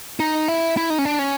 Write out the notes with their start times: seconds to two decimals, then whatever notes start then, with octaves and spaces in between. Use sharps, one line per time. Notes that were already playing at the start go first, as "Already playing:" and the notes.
0.20 D#4
0.48 E4
0.77 E4
0.90 D#4
0.98 C#4
1.05 D4
1.19 C#4